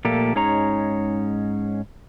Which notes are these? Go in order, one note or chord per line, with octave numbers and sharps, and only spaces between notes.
A#2 F3 A3 A#3 G4 A4
G#2 C#4 D#4 G#4 C#5 A#5